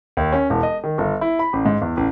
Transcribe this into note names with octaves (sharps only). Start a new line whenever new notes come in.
D#2
C#4
E1
D#5
D#3
G1
E4
B5
A1
G#2
E2
A1